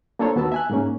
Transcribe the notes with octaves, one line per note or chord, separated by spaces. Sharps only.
A#3 D4 F4 A4 C5 C#5
D#2 B3 F#4 A5 E6
E5 G#5 F#6
G#2 A#3 C#4